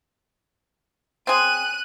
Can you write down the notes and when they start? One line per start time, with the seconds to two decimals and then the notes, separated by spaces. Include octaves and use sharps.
1.27 C4 G#4 F#6 D#7